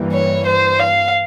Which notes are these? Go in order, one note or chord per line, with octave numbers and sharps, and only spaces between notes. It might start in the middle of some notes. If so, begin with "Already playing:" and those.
Already playing: G2 E3 G3 A#3
C#5
C5
F5